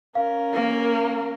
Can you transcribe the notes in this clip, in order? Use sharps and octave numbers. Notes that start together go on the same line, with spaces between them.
C#4 A#4 F5
A#3